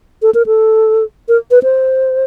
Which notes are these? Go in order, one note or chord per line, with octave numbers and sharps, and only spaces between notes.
A4
A#4
A4
A#4
B4
C5